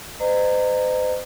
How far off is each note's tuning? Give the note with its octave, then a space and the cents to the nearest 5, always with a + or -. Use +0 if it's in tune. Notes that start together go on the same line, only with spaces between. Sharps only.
C5 -35 D#5 -30 A#5 -25